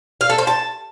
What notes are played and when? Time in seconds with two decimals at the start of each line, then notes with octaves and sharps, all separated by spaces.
0.21 F5
0.30 A4
0.38 C5
0.47 A5